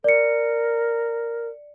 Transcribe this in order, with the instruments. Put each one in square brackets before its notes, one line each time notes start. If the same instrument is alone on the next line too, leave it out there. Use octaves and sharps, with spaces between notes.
[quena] A#4 [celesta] D5 C#7